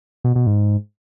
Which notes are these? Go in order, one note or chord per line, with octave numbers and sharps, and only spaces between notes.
B2
B2
G#2